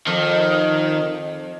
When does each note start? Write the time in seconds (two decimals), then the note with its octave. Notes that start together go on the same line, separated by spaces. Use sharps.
0.07 F2 D#3